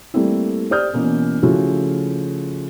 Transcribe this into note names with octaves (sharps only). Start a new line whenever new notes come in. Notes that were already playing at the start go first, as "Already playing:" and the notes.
G3 A3 A#3 C4 E4
G4 C5 D5 D#6 F6 G6
B2 E3 A#3 C#4
C#3 F3 A3 E4 F#4 A4